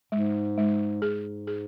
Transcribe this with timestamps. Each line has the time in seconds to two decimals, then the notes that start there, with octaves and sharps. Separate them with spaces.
0.12 G#2 G#3
0.58 G#3
1.02 G#2 G#4
1.47 G#4